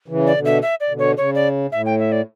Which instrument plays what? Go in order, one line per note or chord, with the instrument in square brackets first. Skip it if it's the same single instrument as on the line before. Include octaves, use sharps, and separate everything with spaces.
[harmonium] C#3 E3
[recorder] D5
[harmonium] B2 D3
[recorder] E5
E5
D5
[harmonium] B2 D3
[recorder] C#5
[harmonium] C#3 [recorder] C#5
[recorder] D5
[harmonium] A2 [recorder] E5
[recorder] G5
E5
D5